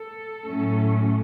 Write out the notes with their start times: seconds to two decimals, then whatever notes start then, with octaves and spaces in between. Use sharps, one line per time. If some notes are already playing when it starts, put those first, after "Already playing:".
Already playing: A4
0.46 A2 F#3 A3 C#4